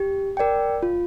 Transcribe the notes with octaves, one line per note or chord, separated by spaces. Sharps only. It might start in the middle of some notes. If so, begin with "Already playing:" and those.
Already playing: G4
A#4 D5 G5
F4